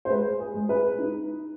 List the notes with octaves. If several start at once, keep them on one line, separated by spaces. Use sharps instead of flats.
C5
G#3 B4
G#4
G#3
B4
D#4